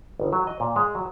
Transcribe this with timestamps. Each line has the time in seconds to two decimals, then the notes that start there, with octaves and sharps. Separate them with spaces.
0.20 G1
0.33 F#3
0.47 D#5
0.60 A#2
0.76 G#3
0.95 F#3